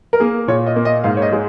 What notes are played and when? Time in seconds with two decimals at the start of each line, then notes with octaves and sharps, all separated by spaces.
0.13 A#4
0.20 A#3 G#4
0.48 A#2 C#5
0.66 D#5
0.76 A#3
0.85 D#5
1.04 G#2 F5
1.17 C#5
1.22 D#5
1.32 G#3